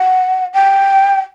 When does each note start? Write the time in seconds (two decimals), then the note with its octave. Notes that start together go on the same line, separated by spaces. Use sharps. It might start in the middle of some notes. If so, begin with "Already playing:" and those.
Already playing: F#5
0.54 G5